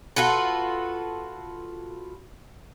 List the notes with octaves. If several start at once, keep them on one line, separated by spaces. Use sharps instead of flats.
F4 F#4 A4 B4